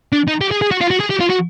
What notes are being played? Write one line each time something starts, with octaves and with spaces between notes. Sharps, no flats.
D4
D#4
G4
G#4
G#4
F#4
F4
F#4
G#4
G4
F4
F#4